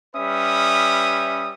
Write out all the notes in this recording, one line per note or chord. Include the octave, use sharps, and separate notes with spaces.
G3 C#4 B4 E5 D#6